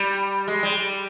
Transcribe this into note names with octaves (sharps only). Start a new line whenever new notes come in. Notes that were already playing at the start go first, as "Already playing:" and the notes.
Already playing: G3
G#3
G3